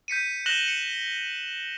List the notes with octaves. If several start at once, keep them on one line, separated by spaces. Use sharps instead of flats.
G6 B6 C#7 D#7
F#6 A#6 E7 F#7 G7
C#7